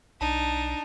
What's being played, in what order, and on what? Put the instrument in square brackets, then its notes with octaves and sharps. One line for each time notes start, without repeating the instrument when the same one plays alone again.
[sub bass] B1 [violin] D4 D#4 [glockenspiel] A5